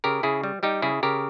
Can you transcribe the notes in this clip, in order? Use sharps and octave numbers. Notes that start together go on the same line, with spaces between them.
C#3 G4 A#4
C#3 E4 G#4
G3
G3 D#4 G4
C#3 E4 G#4
C#3 G4 A#4